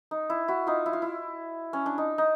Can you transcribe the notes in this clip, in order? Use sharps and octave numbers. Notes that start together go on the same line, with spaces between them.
D#4
E4
E4 F#4
D#4 F4
E4
F4
E4
C#4
D4
D#4
D#4